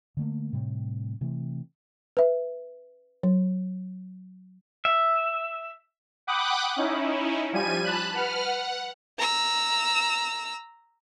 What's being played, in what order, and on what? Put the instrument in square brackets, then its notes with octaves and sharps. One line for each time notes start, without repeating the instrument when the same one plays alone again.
[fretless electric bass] D3 A3 A#3
A2 C3 G3
C3 E3 A3
[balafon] B4 E5
F#3
[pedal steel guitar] E5
[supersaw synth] F#5 G5 B5 D6 D#6 F#6
C#4 D#4 E4
F3 G3 G#5 D#7
A5 B5 F#6
B4 F#5 F6
F#5
[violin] A#5 E6